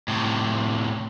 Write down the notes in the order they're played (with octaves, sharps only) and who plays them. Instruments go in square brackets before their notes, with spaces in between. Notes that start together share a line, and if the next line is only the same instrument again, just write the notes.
[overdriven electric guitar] A2 C3